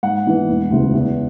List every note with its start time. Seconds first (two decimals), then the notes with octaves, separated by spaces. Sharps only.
0.03 G#2 F#5
0.26 E3 B3 D4
0.49 E1
0.70 D2 C#3 E3
0.93 E2